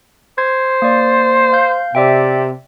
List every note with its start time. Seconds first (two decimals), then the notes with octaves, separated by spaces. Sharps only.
0.38 C5 G#6
0.82 A#3 D5
1.52 F5 G6
1.95 C3 D5 E5 G5